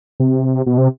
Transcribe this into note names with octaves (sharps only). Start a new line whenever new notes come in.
C3
B2
C3